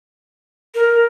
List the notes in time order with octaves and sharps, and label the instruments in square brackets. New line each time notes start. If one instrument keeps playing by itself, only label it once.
[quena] A#4